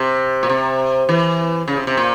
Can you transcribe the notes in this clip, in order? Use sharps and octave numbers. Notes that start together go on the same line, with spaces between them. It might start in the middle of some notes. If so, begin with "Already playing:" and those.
Already playing: C3
A#2
C3
E3
C#3
C3
C3
A#2